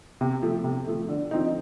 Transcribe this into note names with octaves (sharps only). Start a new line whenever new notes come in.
C3
F3 A3
C3
F3 A3
D3
F3 C4 D#4